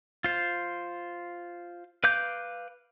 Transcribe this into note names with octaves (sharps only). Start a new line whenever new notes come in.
F4 C5
B4 F5 D6 G6